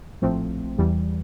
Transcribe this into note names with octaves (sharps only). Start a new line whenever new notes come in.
A#1 A2 F3 A3 C4
E2 E3 G3